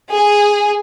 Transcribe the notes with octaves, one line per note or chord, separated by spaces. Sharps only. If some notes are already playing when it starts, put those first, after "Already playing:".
G#4